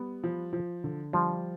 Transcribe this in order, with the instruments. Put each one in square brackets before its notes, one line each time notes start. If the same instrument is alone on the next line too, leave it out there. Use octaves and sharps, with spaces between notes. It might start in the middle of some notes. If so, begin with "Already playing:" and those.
Already playing: [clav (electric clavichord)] G3 [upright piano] B3
[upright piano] F3
F3
D3
[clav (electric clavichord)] F3 [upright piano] G3